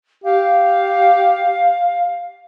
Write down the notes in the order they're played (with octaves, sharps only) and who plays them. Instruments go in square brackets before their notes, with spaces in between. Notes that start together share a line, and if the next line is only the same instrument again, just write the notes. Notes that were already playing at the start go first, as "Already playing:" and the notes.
[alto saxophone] G4 [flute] F5